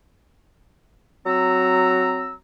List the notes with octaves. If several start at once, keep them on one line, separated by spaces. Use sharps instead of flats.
F#3 C4 A#5 E6